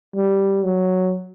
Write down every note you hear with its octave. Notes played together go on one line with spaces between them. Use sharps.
G3
F#3